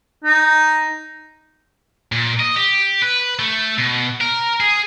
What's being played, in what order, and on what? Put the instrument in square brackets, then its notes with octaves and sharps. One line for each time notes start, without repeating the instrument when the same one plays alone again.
[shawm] D#4
[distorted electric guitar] A#2
D#5
G4
B4
A3
B2
A#4
G#4